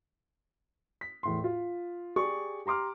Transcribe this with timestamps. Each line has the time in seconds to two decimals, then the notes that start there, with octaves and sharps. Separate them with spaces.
1.01 B6
1.23 E2 A2 C6
1.44 F4
2.16 G4 G#4 D5 C#6
2.66 G4 A#5 C6 D6 F6